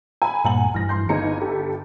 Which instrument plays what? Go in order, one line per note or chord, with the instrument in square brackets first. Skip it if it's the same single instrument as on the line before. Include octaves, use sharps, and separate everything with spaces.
[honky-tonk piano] G#5 B5
[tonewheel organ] G2 A#2 [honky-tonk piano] F#5 G#5 F#7
[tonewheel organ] G2 E3 [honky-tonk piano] F6 A#6
[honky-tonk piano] C6 G6
[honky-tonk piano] G1 A#5 C#7 [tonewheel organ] D#4 G#5
[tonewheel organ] G4 A4